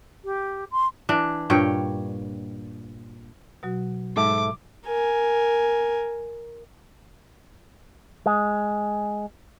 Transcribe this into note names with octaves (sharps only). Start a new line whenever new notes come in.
G4
C6
E3 D4
G2 A#2 C#5 G5
B2 F#3 F#4
G#2 A4 E5 D6
A#4 G#5
G#3